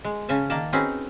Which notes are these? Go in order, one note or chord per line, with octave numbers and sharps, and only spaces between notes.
G#3
C#3 C#4 G#5 A5
D#3 A#3 D5 A5
C4 C#4 D#4 F#4 G#4 B4